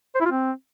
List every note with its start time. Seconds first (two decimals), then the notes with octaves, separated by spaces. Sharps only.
0.15 C5
0.20 E4
0.26 F4
0.31 C4